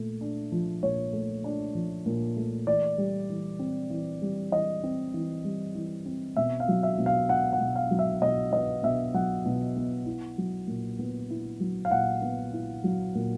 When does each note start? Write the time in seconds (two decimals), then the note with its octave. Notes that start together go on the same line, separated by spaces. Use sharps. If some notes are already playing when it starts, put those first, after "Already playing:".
Already playing: A#2 A3
0.21 D4
0.52 F3
0.83 A#2 C#5
1.13 A3
1.44 D4
1.75 F3
2.06 A#2
2.37 A3
2.67 E3 D5
2.98 G3
3.29 E3
3.59 C4
3.90 E3
4.22 G3
4.52 E3 D#5
4.83 C4
5.14 E3
5.44 G3
5.75 E3
6.06 C4
6.37 B2 E5
6.60 F5
6.68 F#3
6.83 E5
6.98 B2
7.06 F5
7.29 B3 F#5
7.53 F#5
7.60 B2
7.76 F5
7.91 F#3
7.99 E5
8.22 B2 D#5
8.53 B3 D#5
8.83 B2 E5
9.14 F#3 F#5
9.46 B2
9.76 B3
10.06 E4
10.38 F#3
10.68 A#2
10.99 B3
11.30 E4
11.60 F#3
11.85 F5
11.91 A#2 F#5
12.22 B3
12.53 E4
12.84 F#3
13.15 A#2